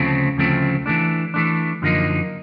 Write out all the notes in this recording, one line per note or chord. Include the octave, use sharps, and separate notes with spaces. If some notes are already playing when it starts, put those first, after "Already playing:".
Already playing: D2 C#3 F3 A3 C4
D2 C#3 F3 A3 C4
E3 A3 D4
E3 A3 D4
F#2 D3 F3 A#3 D#4